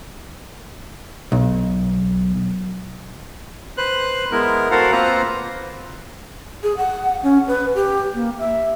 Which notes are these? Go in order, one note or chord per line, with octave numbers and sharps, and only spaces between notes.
B1
B4 C5 F#6
G#3 B3 E4 A#4
F#4 A4 A#4 C5 F5 F#5
A#3 C4 F4 B4 C5 A#5
G#4
F#5
C#4
B4
G4
A#3
E5